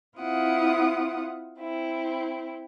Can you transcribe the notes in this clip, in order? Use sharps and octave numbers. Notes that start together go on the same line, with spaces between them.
C4 E4 F4 F#5 D#6
C4 E4